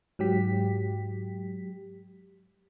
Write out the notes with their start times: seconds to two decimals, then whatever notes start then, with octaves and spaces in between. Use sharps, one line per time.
0.19 G#2 F#3 G4 B6